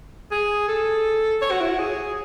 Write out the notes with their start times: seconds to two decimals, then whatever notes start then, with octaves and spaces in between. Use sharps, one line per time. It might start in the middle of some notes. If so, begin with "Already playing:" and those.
0.31 G#4
0.68 A4
1.42 C#5
1.51 F#4
1.61 E4
1.69 F#4
1.79 G#4